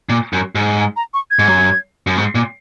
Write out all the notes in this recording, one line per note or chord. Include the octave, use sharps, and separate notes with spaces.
A#2
F#2
G#2
G#5
A#5
C#6
G#6
G#2
F#2
F#2
G#2
A#2